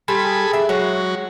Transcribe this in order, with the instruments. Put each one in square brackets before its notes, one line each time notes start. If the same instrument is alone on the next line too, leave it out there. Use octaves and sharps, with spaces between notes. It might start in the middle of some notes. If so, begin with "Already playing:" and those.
[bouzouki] G3 [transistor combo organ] A4 G#5 B5 [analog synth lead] C6
[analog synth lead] G#4
[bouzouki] D4 E5
[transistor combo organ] F#3 F#4 [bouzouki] G#3 [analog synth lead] C#5